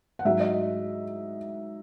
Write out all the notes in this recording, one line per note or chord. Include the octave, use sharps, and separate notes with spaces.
F#5
G#2 F#3 E5
D#5